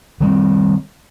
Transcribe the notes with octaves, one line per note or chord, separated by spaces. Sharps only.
D#3 G3 A#3 C4